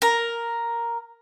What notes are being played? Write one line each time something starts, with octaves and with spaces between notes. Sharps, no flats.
A#4